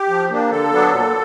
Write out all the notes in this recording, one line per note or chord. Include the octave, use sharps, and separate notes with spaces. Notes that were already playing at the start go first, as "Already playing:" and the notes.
Already playing: G4
F3
A#3 D4
D3 A4
F#3 B3 D4
A#2